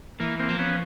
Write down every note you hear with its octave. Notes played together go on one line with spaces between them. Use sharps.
E3 A#3
A#3 C4
F3
B3 C#4